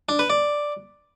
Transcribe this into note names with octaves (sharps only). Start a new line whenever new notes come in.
D4
B4
D5